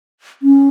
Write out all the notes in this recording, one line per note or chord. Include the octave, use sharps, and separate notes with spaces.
C#4